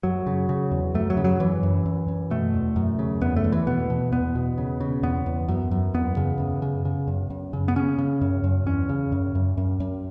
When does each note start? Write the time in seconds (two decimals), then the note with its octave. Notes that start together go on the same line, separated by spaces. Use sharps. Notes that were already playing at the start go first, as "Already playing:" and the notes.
0.03 F#2 F#3
0.27 C#3
0.49 C#3
0.71 E2
0.95 F#2 A3
1.10 F#3
1.17 C#3
1.24 F#3
1.40 F#2 E3
1.63 F#2
1.86 F#2
2.08 F#2
2.30 B2 A3
2.54 E2
2.76 F#2
2.99 C#3
3.21 E2 B3
3.36 A3
3.44 E2
3.52 E3
3.67 B2 B3
3.90 B2
4.12 E2 B3
4.35 B2
4.58 C#3
4.80 C#3
5.03 E2 B3
5.26 E2
5.48 F#2
5.71 F#2
5.94 E2 B3
6.17 C#3
6.40 F#2
6.62 C#3
6.85 C#3
7.08 F#2
7.30 F#2
7.53 C#3
7.68 B3
7.76 C#3 C#4
7.98 C#3
8.21 F#2
8.44 F#2
8.66 E2 C#4
8.89 C#3
9.12 F#2
9.35 F#2
9.57 F#2
9.80 F#2